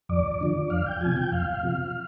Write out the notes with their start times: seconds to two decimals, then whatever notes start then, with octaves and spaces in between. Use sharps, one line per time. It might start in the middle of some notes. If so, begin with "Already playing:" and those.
0.09 F2 D5
0.41 D3 F3
0.70 F2 F5
0.86 G5
1.01 C3 F3 G#5
1.16 G5
1.32 F2 F5
1.63 C3 F3